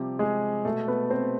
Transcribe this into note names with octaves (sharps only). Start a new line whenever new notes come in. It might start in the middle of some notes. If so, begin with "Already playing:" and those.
Already playing: C3 F3 G3 G4
G#3 G#4
B2 A3 A4
B3 B4
C4 C5